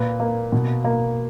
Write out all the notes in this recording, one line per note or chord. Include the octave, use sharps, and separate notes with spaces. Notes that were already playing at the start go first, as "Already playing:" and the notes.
Already playing: A#2 B4
A#3
B2
A#3